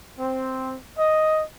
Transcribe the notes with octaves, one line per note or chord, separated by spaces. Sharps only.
C4
D#5